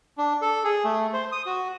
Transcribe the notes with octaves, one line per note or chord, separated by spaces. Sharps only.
D4
A4
G#4
A3
C5
D#6
F#4